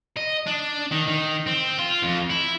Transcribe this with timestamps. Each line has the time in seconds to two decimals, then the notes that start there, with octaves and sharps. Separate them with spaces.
0.17 D#5
0.47 D4
0.91 D#3
1.07 D#3
1.47 C4
1.79 F4
2.03 F2
2.30 E4